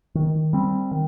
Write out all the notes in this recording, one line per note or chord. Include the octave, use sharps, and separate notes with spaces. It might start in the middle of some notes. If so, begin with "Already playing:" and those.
D#3
G3 C4
D#3